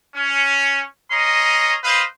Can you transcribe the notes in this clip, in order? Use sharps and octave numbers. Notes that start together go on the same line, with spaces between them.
C#4
C#4 D#5 A#5 C6
B4 C5 D#5 F5